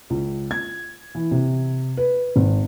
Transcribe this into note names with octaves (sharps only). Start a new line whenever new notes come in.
C#2
G#6
E3
C3
B4
G#1